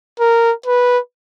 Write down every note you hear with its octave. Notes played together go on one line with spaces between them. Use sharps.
A#4
B4